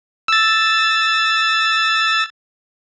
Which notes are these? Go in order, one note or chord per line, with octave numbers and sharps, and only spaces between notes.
E6 A6